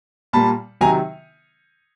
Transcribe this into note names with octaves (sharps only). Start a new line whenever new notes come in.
A#2 G3 A#3 A5 B5
C3 D#3 F#3 G#5 A#5